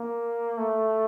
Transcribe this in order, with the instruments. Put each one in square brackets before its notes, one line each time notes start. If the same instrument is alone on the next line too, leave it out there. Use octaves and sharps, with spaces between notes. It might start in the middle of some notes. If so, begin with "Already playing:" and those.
Already playing: [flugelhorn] A#3
A3